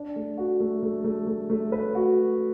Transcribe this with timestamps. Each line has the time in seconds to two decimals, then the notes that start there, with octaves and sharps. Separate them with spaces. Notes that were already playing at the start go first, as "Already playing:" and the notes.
Already playing: D4
0.16 A3
0.38 F#4
0.60 A3
0.83 A3
1.04 A3
1.27 A3
1.50 A3
1.72 B4
1.95 F#4